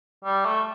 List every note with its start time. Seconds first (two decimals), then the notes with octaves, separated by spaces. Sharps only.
0.25 G3
0.45 A3